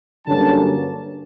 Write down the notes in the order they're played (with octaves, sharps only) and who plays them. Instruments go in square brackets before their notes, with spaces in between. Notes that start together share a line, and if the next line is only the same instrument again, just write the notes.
[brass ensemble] G2 D3 F#3 A#3 C#4 A5